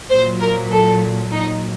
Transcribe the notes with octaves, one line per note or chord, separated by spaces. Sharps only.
A#2 F#3 C5
A#4
A4
A#2 F#3 D#4